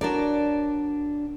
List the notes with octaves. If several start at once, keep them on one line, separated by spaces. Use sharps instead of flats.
D4 F#4 A#4 C#5 D5